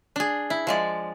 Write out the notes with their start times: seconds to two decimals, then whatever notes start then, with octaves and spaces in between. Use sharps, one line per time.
0.16 D4 G#4
0.50 E4
0.67 F3 G#3 D5